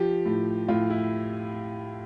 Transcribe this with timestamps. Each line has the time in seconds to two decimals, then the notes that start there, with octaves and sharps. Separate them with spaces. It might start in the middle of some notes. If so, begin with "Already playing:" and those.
Already playing: F3 G4
0.25 A2
0.68 A2 F4
0.90 E4